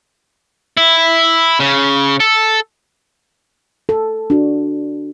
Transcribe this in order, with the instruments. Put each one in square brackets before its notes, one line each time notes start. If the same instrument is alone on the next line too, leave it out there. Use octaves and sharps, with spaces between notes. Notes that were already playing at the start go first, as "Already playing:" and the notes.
[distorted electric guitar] E4
C#3
A4
[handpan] A4
D4 F#4